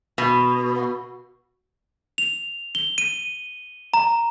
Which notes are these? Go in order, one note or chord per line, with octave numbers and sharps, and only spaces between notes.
B2
F7
G7
D#7
A#5